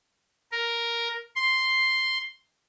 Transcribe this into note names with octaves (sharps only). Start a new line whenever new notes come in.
A#4
C6